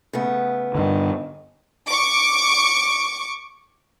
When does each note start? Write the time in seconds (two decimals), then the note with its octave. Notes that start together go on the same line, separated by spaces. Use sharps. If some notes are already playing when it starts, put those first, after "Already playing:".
0.13 C#3 A3 B3
0.75 G2 D3 D#3
1.87 C#6 D6